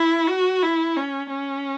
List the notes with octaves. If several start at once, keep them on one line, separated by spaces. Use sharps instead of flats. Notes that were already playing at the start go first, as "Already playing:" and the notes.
Already playing: E4
F#4
E4
C#4
C#4